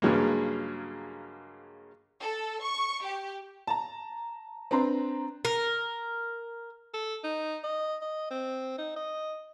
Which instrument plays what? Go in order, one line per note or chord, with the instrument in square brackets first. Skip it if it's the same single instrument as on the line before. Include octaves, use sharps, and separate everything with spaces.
[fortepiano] G2 C#3 F#3 G#3 A#3
[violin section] A4
C#6
G4
[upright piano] A5 A#5
C4 D4 B4 A#5 C6
[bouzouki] A#4
[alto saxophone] A4
D#4
D#5
D#5
C4
D#4
D#5